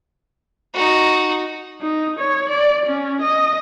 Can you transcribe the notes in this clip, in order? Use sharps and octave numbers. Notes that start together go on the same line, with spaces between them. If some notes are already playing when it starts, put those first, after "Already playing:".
D#4 F#4
D#4
C#5
D5
C#4
D#5